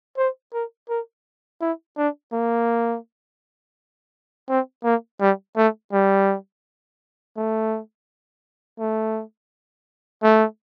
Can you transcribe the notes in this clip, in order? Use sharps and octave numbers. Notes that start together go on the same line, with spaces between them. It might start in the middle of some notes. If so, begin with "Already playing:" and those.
C5
A#4
A#4
E4
D4
A#3
C4
A#3
G3
A3
G3
A3
A3
A3